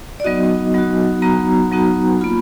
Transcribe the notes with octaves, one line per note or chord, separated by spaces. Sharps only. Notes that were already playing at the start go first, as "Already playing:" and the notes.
D5
F#3 B3 D#4 F#4 D#5
F#3 B3 D#4 F#4
F#3 B3 D#4 F#4 A#5
F#3 B3 D#4 F#4
A#3 F4 B5